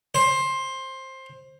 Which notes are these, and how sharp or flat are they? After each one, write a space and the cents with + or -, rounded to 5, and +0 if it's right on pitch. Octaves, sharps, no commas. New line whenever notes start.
C5 +15